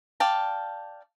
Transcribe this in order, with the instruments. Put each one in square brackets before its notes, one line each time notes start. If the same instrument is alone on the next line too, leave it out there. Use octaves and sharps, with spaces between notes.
[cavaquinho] D5 F5 G5 A5